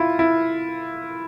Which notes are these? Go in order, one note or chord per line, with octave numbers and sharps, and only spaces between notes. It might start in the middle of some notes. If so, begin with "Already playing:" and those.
Already playing: E4 F4
E4